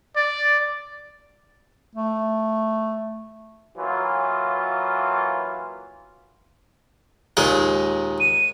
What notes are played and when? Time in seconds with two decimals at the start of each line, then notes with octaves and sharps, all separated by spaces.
0.16 D5
1.95 A3
3.78 E3 F#3 A#3 F4
7.37 D#2 A#2 G#3
8.20 D#7